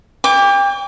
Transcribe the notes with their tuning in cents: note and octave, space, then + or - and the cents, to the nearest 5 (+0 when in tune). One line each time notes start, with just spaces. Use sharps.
D5 -40 G5 +35 D6 -15